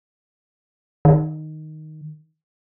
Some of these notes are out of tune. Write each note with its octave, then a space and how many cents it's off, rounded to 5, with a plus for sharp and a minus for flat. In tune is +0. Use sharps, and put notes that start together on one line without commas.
D#3 -5